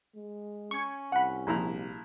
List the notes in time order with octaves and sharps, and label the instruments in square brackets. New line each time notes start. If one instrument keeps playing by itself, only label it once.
[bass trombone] G#3
[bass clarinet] C#4 [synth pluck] C#6 G#6
[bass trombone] C2 [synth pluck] F#5 B5
[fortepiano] A#1 E4 A#5